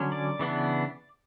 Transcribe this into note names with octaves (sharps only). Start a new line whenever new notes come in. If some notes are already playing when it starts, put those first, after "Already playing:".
Already playing: D3 F#3 C#4
D5
C#3 E3 B3 D4